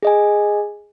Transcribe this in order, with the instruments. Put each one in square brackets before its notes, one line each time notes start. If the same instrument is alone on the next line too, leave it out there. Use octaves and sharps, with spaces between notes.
[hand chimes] G#4 D#5 G#5